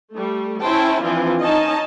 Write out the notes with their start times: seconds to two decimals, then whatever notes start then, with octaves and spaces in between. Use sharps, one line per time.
0.11 G3 A3
0.61 C#4 E4 C5 G5 A5
1.02 E3 F3 C4 D4 F4
1.42 C#4 D#4 D#5 A5